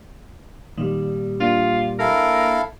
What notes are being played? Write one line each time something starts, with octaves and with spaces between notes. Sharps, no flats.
A#2 D#3 G3
A#3 D4 F4
E4 A4 A#4 F5